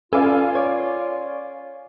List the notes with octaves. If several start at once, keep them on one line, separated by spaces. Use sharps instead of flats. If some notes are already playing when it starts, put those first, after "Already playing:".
C#4 F4 A4 B4 D5 F5 G#5
C#5 D5